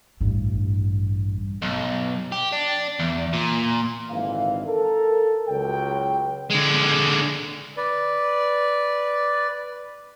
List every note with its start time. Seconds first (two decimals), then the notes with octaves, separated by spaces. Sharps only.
0.21 A1 G2
1.62 B1
2.32 G4
2.52 D4
2.99 E2
3.33 A#2
4.11 G#1 D3 E3 F5
4.66 A4 A#4
5.49 C#2 F#3 G5
6.50 D3 G#3
7.77 B4 D5